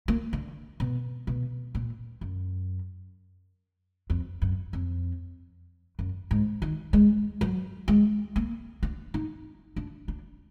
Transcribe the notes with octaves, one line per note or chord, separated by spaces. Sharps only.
A#3
D3
B2
B2
A#2
F#2
F2
F#2
F2
F#2
G#2
D#3
G#3
F#3
G#3
A#3
D4
D#4
D4
D4